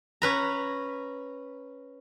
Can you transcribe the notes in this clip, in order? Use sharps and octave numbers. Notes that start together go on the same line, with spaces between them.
C#4 B4 A#5